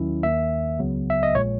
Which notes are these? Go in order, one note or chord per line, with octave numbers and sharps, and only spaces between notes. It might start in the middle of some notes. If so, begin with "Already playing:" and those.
Already playing: D#2 D#3 F#3 C#4 E4
D#2 D#3 A#3 E5
C#2 C#3 F#3 B3
E5
D#5
A#1 A#2 G#3 C#5